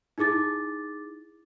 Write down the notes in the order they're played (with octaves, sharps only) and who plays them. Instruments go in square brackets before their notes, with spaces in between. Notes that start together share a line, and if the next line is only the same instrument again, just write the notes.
[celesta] D#4 E4 G#4 D6 A6